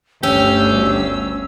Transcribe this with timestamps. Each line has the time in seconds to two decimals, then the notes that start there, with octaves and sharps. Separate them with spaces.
0.23 G1 D2 C#4 G4 E6